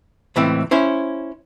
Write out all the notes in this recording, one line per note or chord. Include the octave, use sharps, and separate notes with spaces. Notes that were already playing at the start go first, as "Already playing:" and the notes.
C#2 A2 E3 A3 C4
C#4 E4 C5